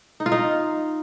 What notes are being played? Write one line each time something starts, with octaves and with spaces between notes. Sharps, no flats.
D#4
F4
D#4